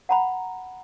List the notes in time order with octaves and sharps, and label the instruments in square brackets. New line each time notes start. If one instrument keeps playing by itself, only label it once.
[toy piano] F#5 A#5 B5